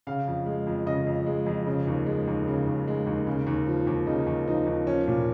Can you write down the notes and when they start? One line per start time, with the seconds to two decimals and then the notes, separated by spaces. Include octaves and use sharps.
0.07 C#3 F5
0.27 F2
0.46 G#3
0.67 F2
0.86 C#3 D#5
1.06 F2
1.26 G#3
1.46 F2
1.66 C#3
1.87 D#2
2.06 G#3
2.27 D#2
2.47 C#3
2.67 D#2
2.88 G#3
3.06 D#2
3.27 C#3
3.47 D#2
3.67 F3
3.87 D#2
4.07 C#3 D#4
4.26 D#2
4.47 F3 D#4
4.66 D#2
4.86 F3 C#4
5.08 A#2